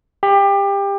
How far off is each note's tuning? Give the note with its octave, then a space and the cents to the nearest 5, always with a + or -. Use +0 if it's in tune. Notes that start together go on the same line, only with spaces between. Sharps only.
G4 +25